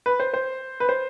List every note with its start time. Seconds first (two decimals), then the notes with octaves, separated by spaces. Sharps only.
0.06 B4
0.20 C5
0.34 C5
0.80 B4
0.89 C5